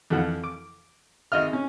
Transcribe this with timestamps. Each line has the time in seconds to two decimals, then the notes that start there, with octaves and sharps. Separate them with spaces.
0.10 F2 E3 F3 F#5
0.44 D6
1.32 G#1 D#5 E5 F6
1.53 C#4